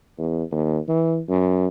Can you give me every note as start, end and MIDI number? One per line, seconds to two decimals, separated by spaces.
0.18 0.43 40
0.52 0.78 39
0.89 1.21 52
1.29 1.67 42